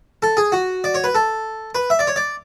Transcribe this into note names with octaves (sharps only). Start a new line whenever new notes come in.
A4
G#4
F#4
D5
C#5
B4
A4
B4
E5
D5
C#5
D5